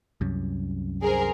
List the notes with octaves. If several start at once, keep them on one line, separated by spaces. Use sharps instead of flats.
C2 F#2
G#4 A#4 C5